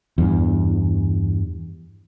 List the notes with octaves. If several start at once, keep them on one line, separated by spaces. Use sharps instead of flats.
E2 G2